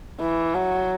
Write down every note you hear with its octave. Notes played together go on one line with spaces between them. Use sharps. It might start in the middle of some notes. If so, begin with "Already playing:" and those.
E3
F#3